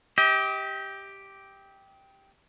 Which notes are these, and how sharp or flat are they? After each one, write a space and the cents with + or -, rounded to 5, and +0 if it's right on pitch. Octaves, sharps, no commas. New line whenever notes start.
G4 +0 D#5 +40